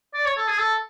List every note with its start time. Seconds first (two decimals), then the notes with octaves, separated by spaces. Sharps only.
0.14 D5
0.25 C#5
0.37 A4
0.48 G#4
0.58 A4